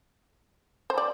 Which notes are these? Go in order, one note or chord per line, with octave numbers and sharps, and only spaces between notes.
C5
D5